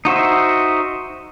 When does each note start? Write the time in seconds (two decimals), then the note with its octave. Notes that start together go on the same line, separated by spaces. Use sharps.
0.05 D#4 F#4 C5 E5